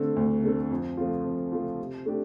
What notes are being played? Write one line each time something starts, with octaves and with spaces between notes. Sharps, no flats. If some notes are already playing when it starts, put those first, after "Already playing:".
Already playing: D3 A3 C4 A4
D2
D3 A3 C4 A4
F2
F3 A3 C4 F4
F2
F3 A3 C4 F4
C3
A3 D4 G4